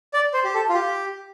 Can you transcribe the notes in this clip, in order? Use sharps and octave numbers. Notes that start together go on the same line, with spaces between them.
D5
C5
G4
A4
F4
G4